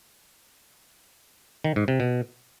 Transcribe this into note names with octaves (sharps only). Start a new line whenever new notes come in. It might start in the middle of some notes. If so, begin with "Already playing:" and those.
D#3
G#2
C3
B2